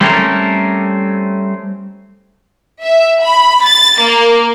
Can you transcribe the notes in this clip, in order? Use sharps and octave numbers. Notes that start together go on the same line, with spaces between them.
G3 A3 C4 C#4 A4 A#4
E5
B5
A6
A#3